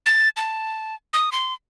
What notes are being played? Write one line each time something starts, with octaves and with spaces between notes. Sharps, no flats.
A6
A5
D#6
C6